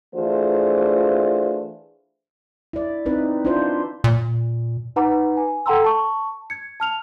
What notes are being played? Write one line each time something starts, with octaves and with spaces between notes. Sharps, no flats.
E3 A3 D4 F4 G#4 C5
E4 D5
C4 D#4 B4
D4 E4 F4 C5
A#2
D#4 B4 F#5 A#5 B5 D6
G#5
A4 F#5 G5 A#5 C6 E6
A5 C#6
G#6 C#7
A5 F6 F7